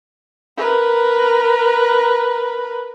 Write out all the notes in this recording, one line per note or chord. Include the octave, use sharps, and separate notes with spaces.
A#4 B4